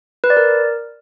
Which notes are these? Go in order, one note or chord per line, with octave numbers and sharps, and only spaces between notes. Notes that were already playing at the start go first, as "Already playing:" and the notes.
B4
D5
A#4